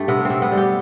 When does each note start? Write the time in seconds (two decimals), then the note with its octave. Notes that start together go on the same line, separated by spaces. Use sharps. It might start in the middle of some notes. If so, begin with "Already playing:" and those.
Already playing: G2 A3 G4
0.08 C3 B3
0.25 C3 C4
0.42 B3
0.52 G3
0.57 G4